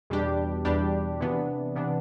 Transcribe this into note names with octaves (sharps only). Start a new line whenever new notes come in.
E2 B2 G3 D4 G4
E2 B2 G3 D4 G4
C3 E3 B3 D4
C3 E3 B3 D4